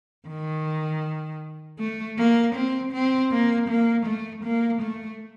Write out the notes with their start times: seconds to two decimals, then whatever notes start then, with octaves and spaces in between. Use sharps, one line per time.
0.28 D#3
1.79 A3
2.18 A#3
2.55 C4
2.93 C4
3.31 A#3
3.69 A#3
4.06 A3
4.44 A#3
4.82 A3